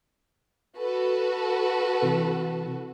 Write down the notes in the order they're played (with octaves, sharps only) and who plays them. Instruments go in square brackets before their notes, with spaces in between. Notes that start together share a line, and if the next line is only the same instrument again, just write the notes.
[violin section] F#4 A4 B4
[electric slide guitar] C3 E3